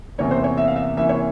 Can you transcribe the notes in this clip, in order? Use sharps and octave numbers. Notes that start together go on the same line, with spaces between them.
E2 C3 E3 A#3 C#4 C#5
C5
C#5
E5
F5
E5
C3 E3 A#3 C#4 E5
C#5